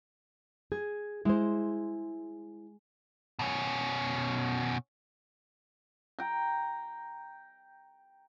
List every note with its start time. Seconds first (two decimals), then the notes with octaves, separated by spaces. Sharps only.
0.72 G#4 G#6
1.25 G#3 E4 C5
3.39 B2 C#4
6.19 G5 A#5